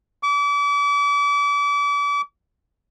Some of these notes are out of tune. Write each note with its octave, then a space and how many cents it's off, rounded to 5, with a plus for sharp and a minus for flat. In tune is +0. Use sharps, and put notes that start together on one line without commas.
D6 -35